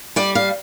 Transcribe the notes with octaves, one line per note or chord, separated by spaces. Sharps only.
G3 D5
F5